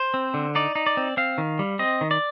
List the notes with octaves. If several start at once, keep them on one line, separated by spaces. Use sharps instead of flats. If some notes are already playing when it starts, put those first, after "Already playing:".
Already playing: C5
C4
D3
D#4 D5
D#4
D5
C4
C4 F5
D#3
G3
C4 D#5
D#3
D5